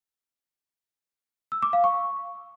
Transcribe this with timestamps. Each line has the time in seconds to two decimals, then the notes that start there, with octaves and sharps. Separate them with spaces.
1.52 E6
1.62 D6
1.73 F5
1.84 C#6